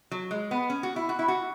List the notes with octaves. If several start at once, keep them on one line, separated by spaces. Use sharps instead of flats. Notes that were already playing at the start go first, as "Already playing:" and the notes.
F#3
G#3
B3
C#4
F#4
E4
F#4
E4
F#4